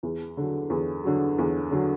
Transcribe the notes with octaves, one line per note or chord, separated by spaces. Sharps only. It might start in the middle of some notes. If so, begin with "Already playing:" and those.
E2
D3 F#3
E2
D3 F#3
E2
D3 F#3